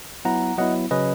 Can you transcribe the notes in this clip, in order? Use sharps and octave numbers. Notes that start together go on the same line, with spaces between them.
F#3 B3 E4 F#5 A#5
F#3 B3 E4 D#5 F#5
C#3 F#3 C#4 B4 D#5